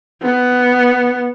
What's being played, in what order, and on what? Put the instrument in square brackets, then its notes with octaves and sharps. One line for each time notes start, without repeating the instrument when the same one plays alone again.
[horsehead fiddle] B3